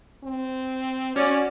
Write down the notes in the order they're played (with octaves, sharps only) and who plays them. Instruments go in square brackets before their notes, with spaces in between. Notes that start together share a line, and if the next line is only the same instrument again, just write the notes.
[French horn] C4
[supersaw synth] C#4 [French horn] F#4 [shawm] D5